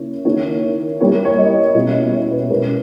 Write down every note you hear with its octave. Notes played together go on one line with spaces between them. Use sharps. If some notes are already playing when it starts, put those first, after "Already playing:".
Already playing: C#3 A#3 E4 C#5
D#3 A#3 E4 C#5
G3 A#3 E4 C#5
C#5
D#5
B2 G3 C#4 E4
C#5
B4
B2 G#3 C#4 A#4